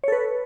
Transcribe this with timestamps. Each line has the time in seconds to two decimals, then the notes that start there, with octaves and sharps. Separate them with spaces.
0.04 C#5
0.08 A4
0.12 B4